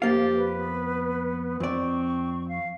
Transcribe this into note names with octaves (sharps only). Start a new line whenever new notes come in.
F2 A#3 G4 F5 A6
B4
B3
F2 C4 D5 C#6
F5